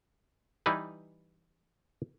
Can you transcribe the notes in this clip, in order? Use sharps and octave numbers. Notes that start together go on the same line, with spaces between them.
E3 G3 D#4 E4 B4